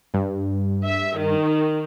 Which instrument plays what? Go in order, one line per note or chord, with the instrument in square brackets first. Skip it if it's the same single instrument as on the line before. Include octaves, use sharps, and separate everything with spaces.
[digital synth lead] G2
[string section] E5
D#3